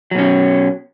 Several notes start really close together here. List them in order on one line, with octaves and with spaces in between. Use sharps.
F#3 B2 C#4